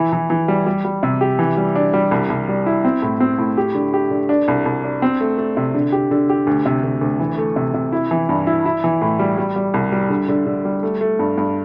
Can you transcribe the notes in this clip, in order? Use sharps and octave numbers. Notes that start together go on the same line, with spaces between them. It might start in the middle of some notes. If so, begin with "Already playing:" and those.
Already playing: E3 E4
E3
E3
G3
G3
G3
C3
G4
E3
G3
D4
G3
C2
C2
G3
E4
C4
A2
C4
A2
G4
D3
G4
D3
D4
C2
C2
D4
C4
A3
A3
C3
D3
G4
D3
G4
D2
C3
D2
D2
E3
A3
C3
C3
E4
E3
G2
E4
E4
E3
A2
G3
G3
G3
C2
G3
D3
D3
D3
G3
A3
A3
G2
G2